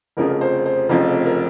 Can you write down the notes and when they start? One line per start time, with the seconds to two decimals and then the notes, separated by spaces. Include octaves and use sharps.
0.17 F1 F2 C#3 F3 A#4
0.41 C5
0.66 C5
0.89 F1 F2 C#3 F3 C5
1.25 A#4